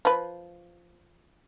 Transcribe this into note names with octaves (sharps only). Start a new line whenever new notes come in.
F3 B4